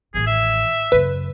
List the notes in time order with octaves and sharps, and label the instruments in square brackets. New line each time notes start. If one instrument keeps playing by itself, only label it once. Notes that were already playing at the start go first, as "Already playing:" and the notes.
[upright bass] A1 D#3 [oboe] G#4
[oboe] E5
[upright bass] F#2 C#3 [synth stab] B4